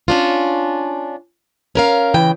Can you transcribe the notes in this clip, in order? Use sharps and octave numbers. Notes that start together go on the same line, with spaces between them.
C#4 D4 F4
C#4 A#4 F5
C#3 E3 G5